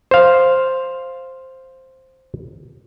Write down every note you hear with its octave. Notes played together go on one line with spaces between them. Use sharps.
C5 F5